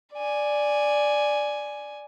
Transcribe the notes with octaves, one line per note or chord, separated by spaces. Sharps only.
D5 G#5